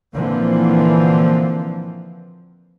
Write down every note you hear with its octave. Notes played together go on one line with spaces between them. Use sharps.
A#2 D3 E3 F3 A#3 C4